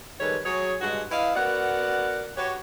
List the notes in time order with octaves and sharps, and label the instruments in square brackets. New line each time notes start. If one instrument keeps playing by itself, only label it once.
[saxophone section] D#3 G3 G#3 A4 B4 C#5
F#3 G#4 C#5
G2 G#3 F#4
E4 B4 D#5 F5
B3 F#4 A#4 D5 F#5
F#4 G4 B4 C#5